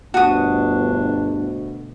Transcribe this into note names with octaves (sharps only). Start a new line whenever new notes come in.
G1 D2 B2 D4 F#4 D#6